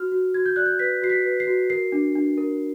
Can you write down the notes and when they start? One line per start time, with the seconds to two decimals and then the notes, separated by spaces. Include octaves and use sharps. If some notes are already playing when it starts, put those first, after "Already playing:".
Already playing: F#4 F6
0.12 F#4
0.34 F#4 G#6
0.46 G6
0.56 D5 F#6
0.66 G6
0.79 B4 B6
1.02 F#4 C7
1.10 B6
1.25 B4
1.40 C7
1.47 F#4
1.70 A#4 C7
1.92 D4
2.15 D4
2.38 A#4